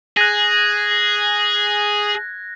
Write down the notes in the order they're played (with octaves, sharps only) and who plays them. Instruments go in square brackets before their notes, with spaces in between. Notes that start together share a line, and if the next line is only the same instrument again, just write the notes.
[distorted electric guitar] G#4 [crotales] F#6 G#6 A#6